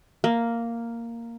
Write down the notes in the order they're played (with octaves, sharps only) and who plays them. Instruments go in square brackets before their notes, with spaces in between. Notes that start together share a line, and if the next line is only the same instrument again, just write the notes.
[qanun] A#3